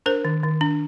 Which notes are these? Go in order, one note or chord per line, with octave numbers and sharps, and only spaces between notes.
D4 A#4 C5
D#3
D#3
D4